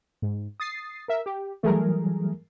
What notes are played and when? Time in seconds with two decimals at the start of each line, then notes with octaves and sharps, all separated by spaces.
0.22 G#2
0.60 D#6 A6 C7
1.08 A#4 E5
1.26 G4
1.63 E3 F#3 G3 A3 G#4 A#4